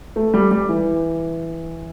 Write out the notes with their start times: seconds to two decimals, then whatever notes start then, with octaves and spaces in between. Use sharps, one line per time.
0.16 A3
0.34 G3
0.51 G3
0.69 E3